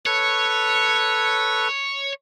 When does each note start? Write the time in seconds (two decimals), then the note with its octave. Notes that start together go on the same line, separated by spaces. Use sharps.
0.06 A4 B4 C#5